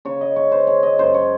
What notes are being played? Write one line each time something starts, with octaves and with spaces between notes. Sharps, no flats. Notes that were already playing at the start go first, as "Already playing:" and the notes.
C#3 C#5
D#5
G#3 C#5
C5
G#3 C#5
D#5
F#2 C5
C#5